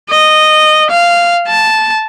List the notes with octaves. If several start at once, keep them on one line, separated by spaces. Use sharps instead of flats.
D#5
F5
A5